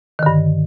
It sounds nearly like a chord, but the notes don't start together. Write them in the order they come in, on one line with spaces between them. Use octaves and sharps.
D#3 D3 G2